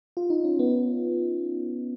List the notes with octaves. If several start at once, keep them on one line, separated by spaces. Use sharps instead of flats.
F4
D#4
C#4
B3